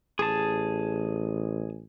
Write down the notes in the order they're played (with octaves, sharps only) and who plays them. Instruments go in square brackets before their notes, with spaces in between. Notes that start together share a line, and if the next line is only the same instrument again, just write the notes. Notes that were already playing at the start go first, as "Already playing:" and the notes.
[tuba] A1 [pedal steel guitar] G#4 A5